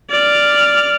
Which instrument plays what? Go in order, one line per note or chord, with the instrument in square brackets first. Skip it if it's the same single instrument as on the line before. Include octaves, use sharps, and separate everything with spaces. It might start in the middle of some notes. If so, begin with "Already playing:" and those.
[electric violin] D5 F6